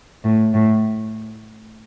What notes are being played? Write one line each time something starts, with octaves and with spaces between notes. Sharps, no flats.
A2
A2